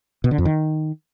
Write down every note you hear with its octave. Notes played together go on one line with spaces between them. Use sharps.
B2
D3
F2
D#3